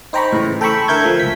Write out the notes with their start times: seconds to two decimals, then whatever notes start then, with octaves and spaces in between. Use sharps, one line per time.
0.13 D#4 C5 G5 A#5 B5 C#6
0.33 A2 C#3 E3
0.61 A4 G5 A#5 B5 C#6 E6
0.88 D3 A#4 E5 G6 G#6
1.04 F3 A3 A4
1.20 C#2 B6